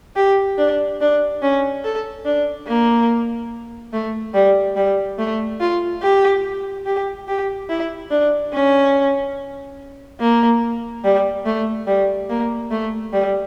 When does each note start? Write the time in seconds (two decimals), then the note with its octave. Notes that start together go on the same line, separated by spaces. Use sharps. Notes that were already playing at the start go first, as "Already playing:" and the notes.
0.16 G4
0.58 D4
1.01 D4
1.42 C#4
1.84 A4
2.25 D4
2.67 A#3
3.93 A3
4.34 G3
4.76 G3
5.18 A3
5.60 F4
6.02 G4
6.86 G4
7.28 G4
7.69 E4
8.11 D4
8.53 C#4
10.20 A#3
11.04 G3
11.45 A3
11.87 G3
12.29 A#3
12.71 A3
13.12 G3